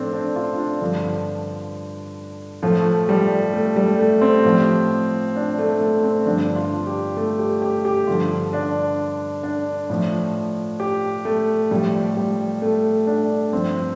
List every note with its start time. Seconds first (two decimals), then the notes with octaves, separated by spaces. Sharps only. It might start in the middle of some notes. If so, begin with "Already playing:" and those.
Already playing: A2 F3 A3 C4 D4
0.13 D4
0.36 F4
0.58 D4
0.81 G2 D3 F3
2.63 A2 F3 A3
3.09 G3
3.53 A3
3.76 G3
3.99 A3
4.21 C4
4.45 A2 F3
5.36 D4
5.59 A3
5.81 A3
6.04 C4
6.26 G2 D3 F3 D4
6.56 F4
6.87 G4
7.17 A3
7.39 G4
7.62 G4
7.85 G4
8.07 G2 D3 F3 F4
8.53 D4
9.43 D4
9.90 A2 F3
10.80 G4
11.25 A3
11.71 A2 F3 G3
12.17 G3
12.62 A3
13.07 D4
13.53 G2 F3 C4